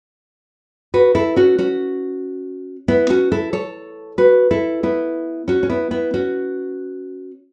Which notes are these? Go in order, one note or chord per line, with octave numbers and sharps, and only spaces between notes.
F#4 B4
E4 A4
C#4 F#4
C#4 F#4
B3 E4
C#4 F#4
E4 A4
A4 C#5
F#4 B4
E4 A4
B3 E4
C#4 F#4
C#4
B3 E4
B3 E4
C#4 F#4